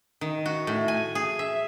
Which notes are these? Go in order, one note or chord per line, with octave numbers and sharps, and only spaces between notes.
D#3
F#4
A2
G#5
G#4
E5